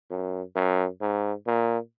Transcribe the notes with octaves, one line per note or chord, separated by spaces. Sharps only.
F#2
F#2
G#2
A#2